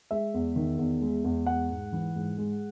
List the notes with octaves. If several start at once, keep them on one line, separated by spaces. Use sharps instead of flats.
G#3 E5
E2
D#3
E2
G#3
E2
G#3 F#5
G#2
E3
G#2
G#3